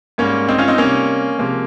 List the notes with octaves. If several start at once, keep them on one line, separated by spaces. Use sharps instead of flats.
G#2 G3 A#3 C#4
C4 D#4
C#4 F4
C4 D#4
C3 G3 A#3 C#4
C3 F3 G#3 A#3